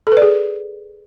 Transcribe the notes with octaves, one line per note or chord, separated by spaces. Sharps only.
A4
B4
D5
G#4